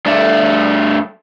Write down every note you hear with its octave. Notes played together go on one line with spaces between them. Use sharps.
G2 A3